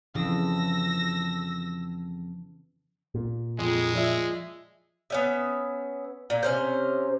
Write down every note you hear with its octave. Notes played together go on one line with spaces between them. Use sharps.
F2 C#3 E3 E6 A#6
A#2
F2 G#3
F3 D5 E5
B3 C#4 E5
A#2
C3 C#4 C5